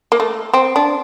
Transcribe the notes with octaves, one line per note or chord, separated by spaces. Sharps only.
A#3
A3
C4
D4